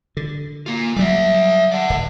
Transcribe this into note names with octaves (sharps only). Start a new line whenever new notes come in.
D3
A#3 F4
F#3 G3 D5 E5
D5 F#5
D1